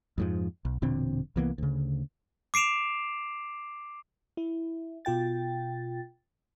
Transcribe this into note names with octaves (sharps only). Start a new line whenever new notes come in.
F2 G#2 F3
B1
E1 A#2 D3 C4
C2 E3 A#3 B3
D2 C#3
D6 C7 D7 E7 F7
E4
B2 F4 G5 A6